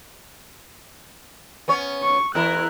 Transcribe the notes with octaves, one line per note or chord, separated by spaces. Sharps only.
B3 C#4 C#5
C#6
E2 E4 A#4 F#6